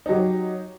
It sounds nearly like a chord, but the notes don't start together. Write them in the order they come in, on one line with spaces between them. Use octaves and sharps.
D#4 F#3 G4